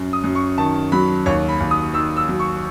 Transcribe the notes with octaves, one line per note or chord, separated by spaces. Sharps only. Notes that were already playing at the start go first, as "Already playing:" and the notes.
Already playing: F#2
D#6
F#2
C#6
D#3 A5
F#3 B5
D#2 C#5
B5
D#2
D#6
D#3 E6
E6
F#3
C#6